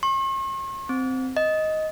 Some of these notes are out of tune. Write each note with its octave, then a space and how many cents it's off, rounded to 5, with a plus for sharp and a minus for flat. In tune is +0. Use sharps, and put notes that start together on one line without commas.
C#6 -45
C4 -10
D#5 +10